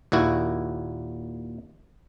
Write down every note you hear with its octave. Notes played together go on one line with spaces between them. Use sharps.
D#2 A#2 E4 F#4